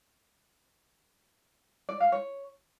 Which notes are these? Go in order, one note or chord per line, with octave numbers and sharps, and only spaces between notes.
D5
F5
C#5